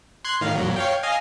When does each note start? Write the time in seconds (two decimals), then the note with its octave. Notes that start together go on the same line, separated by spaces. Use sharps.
0.25 C6 F#6 G#6
0.41 A2 D#3 F5
0.55 F2 A#2 F#3
0.76 C#5 F5 G5
1.03 D#5 F5 G#5